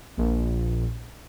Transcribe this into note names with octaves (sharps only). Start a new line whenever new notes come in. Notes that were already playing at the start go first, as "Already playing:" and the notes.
A#1